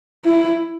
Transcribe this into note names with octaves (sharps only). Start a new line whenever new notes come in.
E4